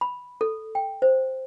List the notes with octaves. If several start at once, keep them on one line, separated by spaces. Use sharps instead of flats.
B5
A4
G5
C5